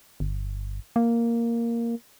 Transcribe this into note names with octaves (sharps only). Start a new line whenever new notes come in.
G1
A#3